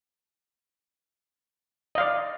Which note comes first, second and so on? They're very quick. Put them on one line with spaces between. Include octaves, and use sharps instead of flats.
D#5 F5 D5